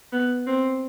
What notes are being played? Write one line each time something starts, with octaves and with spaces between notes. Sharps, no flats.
B3
C4